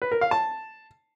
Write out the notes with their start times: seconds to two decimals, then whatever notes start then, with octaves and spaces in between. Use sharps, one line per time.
0.02 B4
0.12 A#4
0.21 F5
0.31 A5